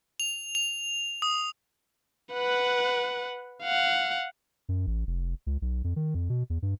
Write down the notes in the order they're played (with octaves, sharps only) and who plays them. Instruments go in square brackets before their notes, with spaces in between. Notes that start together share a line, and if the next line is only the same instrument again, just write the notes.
[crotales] F7
F7
D#6
[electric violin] B4 F#5
F5 F#5
[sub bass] F#2
A1
F1
C#2
B1
F2
D#3
F2
B2
E2
G2